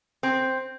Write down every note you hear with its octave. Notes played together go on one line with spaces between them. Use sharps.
C4